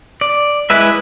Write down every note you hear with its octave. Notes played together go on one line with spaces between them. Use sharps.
D5
G#3 E4 B4 E5